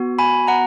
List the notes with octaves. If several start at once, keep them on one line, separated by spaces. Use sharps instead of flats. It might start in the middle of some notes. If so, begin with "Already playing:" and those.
Already playing: B3 F#4
G#5 B5
F#5 A#5